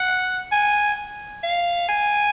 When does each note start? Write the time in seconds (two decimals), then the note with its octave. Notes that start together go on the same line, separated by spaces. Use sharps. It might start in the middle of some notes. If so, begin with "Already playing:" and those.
Already playing: F#5
0.52 G#5
1.43 F5
1.89 G#5